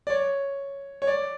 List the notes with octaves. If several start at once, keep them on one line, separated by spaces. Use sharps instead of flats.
D5
C#5
C#5
D5